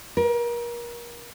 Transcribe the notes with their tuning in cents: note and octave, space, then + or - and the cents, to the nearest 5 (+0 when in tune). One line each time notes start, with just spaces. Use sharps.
A#4 +30